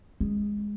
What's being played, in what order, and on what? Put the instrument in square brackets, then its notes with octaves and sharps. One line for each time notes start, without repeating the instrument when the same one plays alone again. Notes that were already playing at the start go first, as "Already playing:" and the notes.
[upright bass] G#3